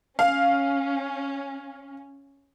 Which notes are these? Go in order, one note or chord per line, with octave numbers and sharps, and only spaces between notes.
C#4 F5